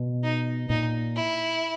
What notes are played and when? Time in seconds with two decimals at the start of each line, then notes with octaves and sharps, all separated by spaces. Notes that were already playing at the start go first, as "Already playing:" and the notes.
Already playing: B2
0.24 D#4
0.69 A#2 D#4
1.16 E4